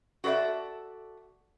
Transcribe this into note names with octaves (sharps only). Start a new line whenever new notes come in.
F#4 A4 B4 D5 E5